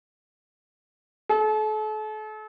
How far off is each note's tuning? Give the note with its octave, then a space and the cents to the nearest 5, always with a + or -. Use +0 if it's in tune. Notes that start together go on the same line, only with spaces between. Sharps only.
A4 -40